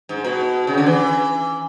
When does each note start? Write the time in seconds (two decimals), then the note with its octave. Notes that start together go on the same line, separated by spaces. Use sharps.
0.09 G#2
0.24 B2
0.67 C#3
0.77 D3
0.86 E3